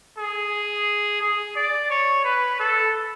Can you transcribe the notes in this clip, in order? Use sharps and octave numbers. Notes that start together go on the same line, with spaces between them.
G#4
G#4
D5
C#5
B4
A4